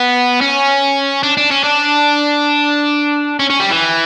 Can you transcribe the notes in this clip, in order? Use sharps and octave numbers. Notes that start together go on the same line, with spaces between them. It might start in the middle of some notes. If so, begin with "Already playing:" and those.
Already playing: B3
C#4
D4
D4
C#4
D4
C#4
C#4
G3
E3